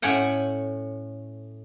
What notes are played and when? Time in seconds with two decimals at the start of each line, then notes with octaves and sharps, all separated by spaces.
0.02 A2 C#4 C#5 F#5 G5